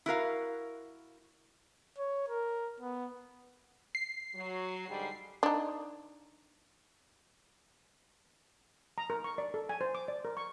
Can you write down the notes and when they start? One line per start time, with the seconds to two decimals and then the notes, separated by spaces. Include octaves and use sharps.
0.06 E4 F#4 A#4 F5
1.99 C#5
2.29 A#4
2.80 B3
3.95 C7
4.35 F#3
4.89 G#2 D3 G3
5.43 D4 D#4
8.98 A#5
9.10 A#4
9.24 C#6
9.38 D5
9.54 A4
9.69 G#5
9.81 C5
9.95 D6
10.08 D5
10.25 A#4
10.37 C#6